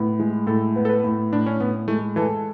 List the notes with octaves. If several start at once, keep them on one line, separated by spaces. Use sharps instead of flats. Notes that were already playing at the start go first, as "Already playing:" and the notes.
Already playing: A2 B3
G#3
A2 A4
B3
A4
B4
A2
A2 D4
C#4
A2 B3
G#3 A3
E3 A4